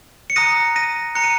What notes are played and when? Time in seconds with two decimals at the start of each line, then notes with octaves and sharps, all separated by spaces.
0.30 C#7
0.36 A#5 D#6 F#6 A#6 D#7
0.76 A#6 D#7
1.15 A#5 F#6 C#7
1.24 D#7